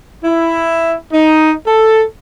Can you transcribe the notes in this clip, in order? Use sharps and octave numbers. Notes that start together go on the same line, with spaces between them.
E4
D#4
A4